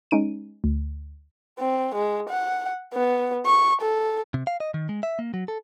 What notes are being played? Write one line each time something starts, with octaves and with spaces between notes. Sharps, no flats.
G#3 C#4 D#4 D7 D#7
D2
C4
G#3
F#5
B3
C#6
A4
C3
F5
D#5
D#3
G#3
E5
A#3
F#3
A4